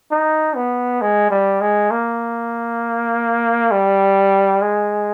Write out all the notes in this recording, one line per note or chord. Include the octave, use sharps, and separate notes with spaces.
D#4
B3
G#3
G3
G#3
A#3
G3
G#3